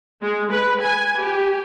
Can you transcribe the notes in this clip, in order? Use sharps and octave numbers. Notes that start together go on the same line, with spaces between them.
G#3
B4
G#5
G4